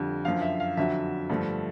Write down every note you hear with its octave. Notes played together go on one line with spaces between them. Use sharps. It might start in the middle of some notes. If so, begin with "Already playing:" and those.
Already playing: F2 D3 G3
F#2 D3 F3 F5
E5
F5
F2 D3 F#3 E5
G2 D3 F3 A3